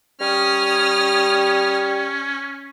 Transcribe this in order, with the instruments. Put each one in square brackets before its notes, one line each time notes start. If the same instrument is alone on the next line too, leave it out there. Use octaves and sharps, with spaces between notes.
[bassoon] G3 [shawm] C#4 [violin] D#6 F6